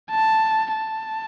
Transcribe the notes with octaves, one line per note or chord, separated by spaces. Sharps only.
A5
A5